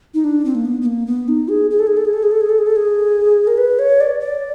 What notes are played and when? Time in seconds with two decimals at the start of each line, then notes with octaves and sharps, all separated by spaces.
0.14 D#4
0.24 D4
0.45 C4
0.55 A#3
0.65 B3
0.82 B3
0.86 A#3
1.07 B3
1.28 D#4
1.49 G#4
1.71 G#4
1.79 A4
1.87 G#4
1.97 A4
2.05 G#4
2.13 A4
2.23 G#4
2.31 A4
2.41 G#4
2.49 A4
2.59 G#4
2.67 A4
2.76 G#4
3.47 A#4
3.58 B4
3.79 C#5
4.00 D5
4.20 D5